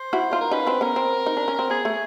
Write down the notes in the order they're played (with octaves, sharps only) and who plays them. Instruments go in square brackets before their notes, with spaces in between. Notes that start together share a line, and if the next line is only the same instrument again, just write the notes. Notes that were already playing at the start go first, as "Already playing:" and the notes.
Already playing: [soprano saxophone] C5
[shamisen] E4 F#4
D#4 F4
[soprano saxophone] A#4
[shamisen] C#4 D#4 [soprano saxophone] B4
[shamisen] C4 D4
[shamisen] B3 C#4 [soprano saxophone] A#4
[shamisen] C4
D#4
D4
C#4
C4
[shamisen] B3 [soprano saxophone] G#4
[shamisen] A3